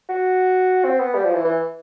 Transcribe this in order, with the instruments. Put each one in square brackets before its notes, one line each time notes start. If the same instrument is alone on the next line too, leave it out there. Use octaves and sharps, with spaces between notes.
[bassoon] F#4
C4
B3
G3
F3
E3
E3